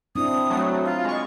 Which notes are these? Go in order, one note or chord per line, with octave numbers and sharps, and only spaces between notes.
C4 D4 E4 D#6
F#3 A3
F4
G#3 C#6